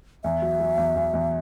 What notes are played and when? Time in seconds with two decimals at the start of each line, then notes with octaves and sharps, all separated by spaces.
0.24 E2 E5
0.42 F#3
0.60 F#3
0.78 E2
0.95 E2
1.14 E2